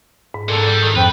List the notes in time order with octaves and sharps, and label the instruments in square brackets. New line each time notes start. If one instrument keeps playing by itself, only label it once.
[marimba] G#2
[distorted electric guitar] A#2 D3 [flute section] A4
[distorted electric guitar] G3
D#3
[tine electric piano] F2 [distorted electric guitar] B4 [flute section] C5 G5